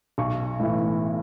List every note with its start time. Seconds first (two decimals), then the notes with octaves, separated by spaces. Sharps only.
0.18 B1 C#6
0.60 A2 E3